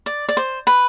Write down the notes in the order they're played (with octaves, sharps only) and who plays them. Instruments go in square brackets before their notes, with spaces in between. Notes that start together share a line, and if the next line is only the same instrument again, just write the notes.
[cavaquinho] D5
D5
C5
B4